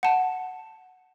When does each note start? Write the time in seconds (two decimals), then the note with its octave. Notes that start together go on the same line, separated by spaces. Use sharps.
0.03 F#5 A5